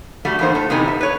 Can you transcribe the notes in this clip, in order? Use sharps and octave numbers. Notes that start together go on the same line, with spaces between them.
G3 A3 F#4
E2 E3 A#3 D#4 C5
A2 A4
E2 C3 E3 B3 D#4
E5
B4 C#5